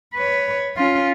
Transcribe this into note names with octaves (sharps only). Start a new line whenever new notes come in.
B4 C#5
C#4 F4